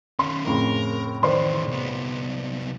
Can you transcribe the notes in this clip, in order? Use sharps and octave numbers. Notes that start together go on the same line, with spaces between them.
D#3 C#4 C6
F2 A2 C#3 A#4
D#3 E3 C5 D5 C6
C2 B3